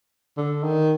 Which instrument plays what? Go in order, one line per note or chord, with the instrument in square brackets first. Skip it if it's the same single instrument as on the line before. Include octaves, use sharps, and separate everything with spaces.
[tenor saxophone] D3
D#3